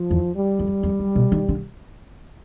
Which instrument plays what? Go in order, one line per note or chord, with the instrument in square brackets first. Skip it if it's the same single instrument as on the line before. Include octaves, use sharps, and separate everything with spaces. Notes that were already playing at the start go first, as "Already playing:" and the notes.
Already playing: [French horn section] F3
[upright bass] E2
[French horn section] G3
[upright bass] F2
F2
F#2
B2
D#3
D3